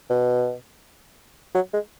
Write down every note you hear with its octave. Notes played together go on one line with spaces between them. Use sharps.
B2
F#3
G#3